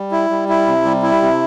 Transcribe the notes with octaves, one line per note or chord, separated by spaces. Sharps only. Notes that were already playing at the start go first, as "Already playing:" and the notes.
Already playing: G3
E4
G3
E4
C3
G3
E4
C3